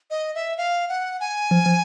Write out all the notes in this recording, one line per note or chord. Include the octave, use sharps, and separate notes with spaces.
D#5
E5
F5
F#5
G#5
F3
F3